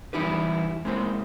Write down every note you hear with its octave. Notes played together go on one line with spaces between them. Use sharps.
E3 G3 D#4 E4 G4 B4
G#3 A#3 C4 E4 C5